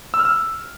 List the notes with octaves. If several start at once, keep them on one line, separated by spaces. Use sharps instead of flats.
E6
F6
E6